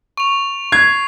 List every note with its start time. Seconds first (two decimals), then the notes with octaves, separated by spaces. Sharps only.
0.17 C#6 F7
0.72 G#6 C7